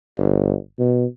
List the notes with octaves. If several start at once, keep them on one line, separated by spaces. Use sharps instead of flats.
G1
B2